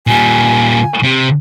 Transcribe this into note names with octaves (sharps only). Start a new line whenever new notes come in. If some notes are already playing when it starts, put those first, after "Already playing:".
A#2 G3 G#5
C3